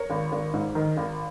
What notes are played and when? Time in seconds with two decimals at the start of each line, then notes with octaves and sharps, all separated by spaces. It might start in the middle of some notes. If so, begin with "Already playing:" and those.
Already playing: A#4 C#5
0.10 G#1
0.32 G#1
0.54 G#2
0.75 D#3
0.97 G#1